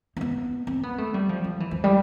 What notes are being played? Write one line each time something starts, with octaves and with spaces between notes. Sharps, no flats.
C4
B3
C4
B3
A3
G3
F3
F3
E3
F3
G3